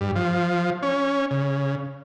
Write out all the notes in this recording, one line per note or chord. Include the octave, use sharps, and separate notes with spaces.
G2
F3
C#4
C#3